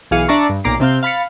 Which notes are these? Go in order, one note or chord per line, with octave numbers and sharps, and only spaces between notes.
B1 E3 G#4 F5 C#7 D#7
D4 D5 E5 A5 A#5 C#6
G2
B1 A#2 A#3 A#5 D6 C7
C3 C4 F5 G6
F5 B5 A6 C#7